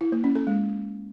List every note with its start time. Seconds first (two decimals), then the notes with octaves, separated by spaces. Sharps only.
0.01 E4
0.12 A#3
0.24 C#4
0.35 A4
0.47 G#3